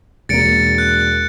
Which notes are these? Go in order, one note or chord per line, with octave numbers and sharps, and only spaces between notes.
E1 A#3 A6 C#7 D7
F#6